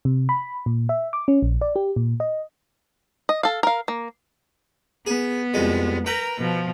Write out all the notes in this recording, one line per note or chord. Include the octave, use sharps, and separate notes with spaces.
C3
B5
A#2
E5
D6
C#4
A#1
D5
G4
A#2
D#5
D#5
A4 F5
A#4 F5
A#3
B3 G#4
C2 F2 G#3
A#4 B4 G5 A#5
B2 F3